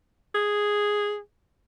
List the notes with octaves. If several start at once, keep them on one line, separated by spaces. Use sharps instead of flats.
G#4